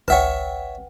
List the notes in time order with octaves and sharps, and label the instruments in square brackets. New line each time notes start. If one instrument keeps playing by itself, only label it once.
[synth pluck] G#1 C#2 [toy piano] B4 F#5 G5 [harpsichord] C#5 E5 A5